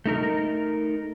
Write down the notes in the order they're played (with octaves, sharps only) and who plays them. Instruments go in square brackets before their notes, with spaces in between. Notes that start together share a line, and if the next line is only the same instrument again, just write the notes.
[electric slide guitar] A3 D#4 A#4